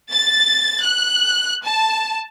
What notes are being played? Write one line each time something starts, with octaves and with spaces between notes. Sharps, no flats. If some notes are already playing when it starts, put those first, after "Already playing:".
A6
F#6
A5